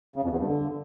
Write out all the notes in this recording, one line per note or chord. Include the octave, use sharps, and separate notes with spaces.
C#3
F2
E2
G2
D3